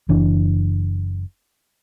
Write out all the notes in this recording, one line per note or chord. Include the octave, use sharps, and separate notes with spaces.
F#1 E3 D4